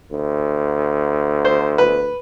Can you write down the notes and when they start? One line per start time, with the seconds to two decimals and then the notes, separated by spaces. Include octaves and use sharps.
0.11 D2
1.45 C5
1.78 B4